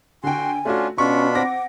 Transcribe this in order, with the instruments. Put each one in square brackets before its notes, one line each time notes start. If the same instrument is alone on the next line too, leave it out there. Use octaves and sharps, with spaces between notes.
[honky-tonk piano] D3 G5 [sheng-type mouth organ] F#4 C6 [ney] G#5
[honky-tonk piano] A3 F#4 [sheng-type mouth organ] C#4 D4 F4
[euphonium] B2 [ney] C#4 [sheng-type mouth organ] D4 F4 B5 [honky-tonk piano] C#6
[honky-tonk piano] C4 D6 A#6 [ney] F#5